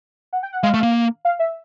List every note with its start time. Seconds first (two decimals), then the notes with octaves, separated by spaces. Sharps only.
0.33 F#5
0.43 G5
0.53 F#5
0.63 G#3 F5
0.74 A3
0.83 A#3
1.25 F5
1.39 E5